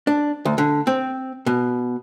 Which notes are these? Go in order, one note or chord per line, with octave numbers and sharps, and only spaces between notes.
D4
D2
D3
C4
B2